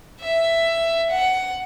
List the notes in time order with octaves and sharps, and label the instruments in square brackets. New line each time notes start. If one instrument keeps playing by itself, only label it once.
[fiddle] E5
F#5